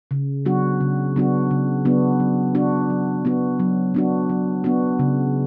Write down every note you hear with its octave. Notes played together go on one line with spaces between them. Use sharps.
C#3
F#3 B3 D4 F#4
C#3
F#3 B3 D4 F#4
C#3
F#3 B3 D4 F#4
F#3
B3 D4 F#4
F#3
B3 D4 F#4
F#3
B3 D4 F#4
F#3
B3 D4 F#4
C#3